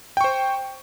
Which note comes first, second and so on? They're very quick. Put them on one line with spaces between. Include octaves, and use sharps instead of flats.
G5 C#6 C5